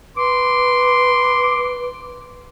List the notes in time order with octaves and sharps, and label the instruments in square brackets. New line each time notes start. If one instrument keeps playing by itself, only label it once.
[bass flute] B4 [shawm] C6 [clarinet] D6